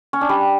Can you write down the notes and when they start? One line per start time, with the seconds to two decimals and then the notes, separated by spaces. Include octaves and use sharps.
0.13 C#4
0.21 D4
0.29 G3